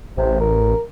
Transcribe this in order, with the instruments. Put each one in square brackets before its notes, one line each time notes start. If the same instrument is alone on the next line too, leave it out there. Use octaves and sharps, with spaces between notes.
[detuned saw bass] A1 [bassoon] C3
[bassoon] A#4